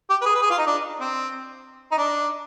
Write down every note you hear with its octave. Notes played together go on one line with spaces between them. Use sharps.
G4
B4
G#4
B4
G#4
F4
D#4
D4
C4
D#4
D4